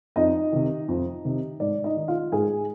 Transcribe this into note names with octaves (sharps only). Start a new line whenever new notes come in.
F2 D#4 D#5
C3 D#3
F2
C3 D#3
G#2 D5
D#4 D#5
D#3
F4 F5
G#2 G#4 G#5